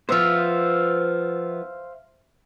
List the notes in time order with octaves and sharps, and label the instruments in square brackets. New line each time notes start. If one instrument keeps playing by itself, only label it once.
[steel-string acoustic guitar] F3 B3 [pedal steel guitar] C5 E5 F5